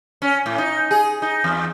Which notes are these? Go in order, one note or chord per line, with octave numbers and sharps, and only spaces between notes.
C#4
A2
D#4
G#4
D#4
E2